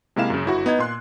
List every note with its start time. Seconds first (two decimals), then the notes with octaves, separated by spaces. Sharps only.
0.16 C3 G#3 A#3 E4 F5 E7
0.30 F#2 C#3
0.46 G1 E4 F#4
0.66 B3 D#4 D#5 G#6
0.79 A#2 C6 F#6